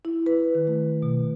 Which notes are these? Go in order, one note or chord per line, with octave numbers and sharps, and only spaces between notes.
E4
B4
D#3
A3
B2